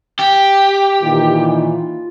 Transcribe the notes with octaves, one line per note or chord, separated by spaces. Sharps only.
G4
A#2 D#3 E3 F4